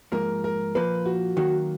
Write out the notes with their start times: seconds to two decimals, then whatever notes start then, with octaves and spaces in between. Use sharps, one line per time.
0.12 G#2 F3 A#3 A#4
0.44 A#4
0.75 A#2 F3 A#3 B4
1.06 F#4
1.37 D#3 F#3 A#3 F#4